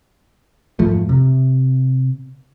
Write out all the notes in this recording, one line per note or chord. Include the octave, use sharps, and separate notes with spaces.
F2 G#2 F3 A3
C3